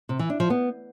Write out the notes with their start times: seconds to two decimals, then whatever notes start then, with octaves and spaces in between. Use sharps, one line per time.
0.09 C3
0.19 E3
0.30 D4
0.40 F3
0.50 B3